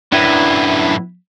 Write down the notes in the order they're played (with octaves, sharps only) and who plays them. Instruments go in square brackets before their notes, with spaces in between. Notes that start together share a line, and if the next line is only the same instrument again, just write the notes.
[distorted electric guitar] F#2 A2 [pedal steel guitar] D4 E4 B4